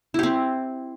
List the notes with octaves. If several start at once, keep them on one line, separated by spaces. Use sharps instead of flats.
C4 E4 G4